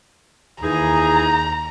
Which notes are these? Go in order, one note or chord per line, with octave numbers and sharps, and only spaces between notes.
D#2 E3 D#4 G#4 A#5